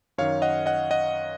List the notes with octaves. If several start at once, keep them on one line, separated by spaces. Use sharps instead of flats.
F#2 D#3 C#5 F5
D#5 F#5
D#5 F#5
D#5 F#5